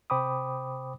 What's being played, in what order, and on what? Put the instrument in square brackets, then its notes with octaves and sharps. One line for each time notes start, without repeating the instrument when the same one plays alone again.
[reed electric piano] C3 C5 G5 B5 D6 D#6